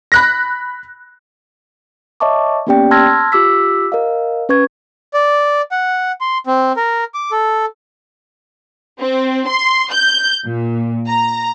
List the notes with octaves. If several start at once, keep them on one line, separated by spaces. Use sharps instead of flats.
B5 F#6 A#6
C#5 D#5 E5 A5 C#6 D6
A#3 B3 C#4 G4 D5 G5
A5 C6 E6 F6 G#6 A#6
F4 G4 D6 E6 B6
A#4 D#5 F5
C#4 B4 C#6 G#6
D5
F#5
C6
C4
A#4
D6
A4
C4
C6
G6
A#2
A#5